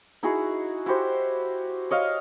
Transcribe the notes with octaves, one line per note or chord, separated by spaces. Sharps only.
D#4 E4 F#4 G#4
E4 F#4 G4 C5
C#5 D#5 F5